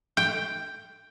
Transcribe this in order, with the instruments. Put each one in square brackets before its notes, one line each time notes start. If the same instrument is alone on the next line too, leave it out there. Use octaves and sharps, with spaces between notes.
[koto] G5